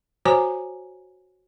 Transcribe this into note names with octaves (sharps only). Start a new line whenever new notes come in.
F#4 C5 C#5 G#5 A#5 D6